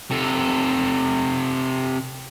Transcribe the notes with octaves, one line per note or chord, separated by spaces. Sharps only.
C3 A4